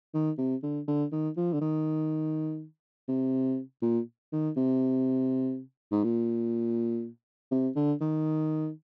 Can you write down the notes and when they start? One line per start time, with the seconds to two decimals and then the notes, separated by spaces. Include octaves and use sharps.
0.14 D#3
0.38 C3
0.63 D3
0.87 D3
1.12 D#3
1.37 F3
1.53 D3
1.61 D#3
3.08 C3
3.82 A#2
4.32 D#3
4.57 C3
5.92 G#2
6.04 A#2
7.52 C3
7.76 D3
8.01 D#3